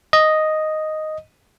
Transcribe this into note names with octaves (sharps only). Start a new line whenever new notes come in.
D#5